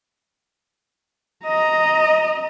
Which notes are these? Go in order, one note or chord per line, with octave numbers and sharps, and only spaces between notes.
D#5 A#5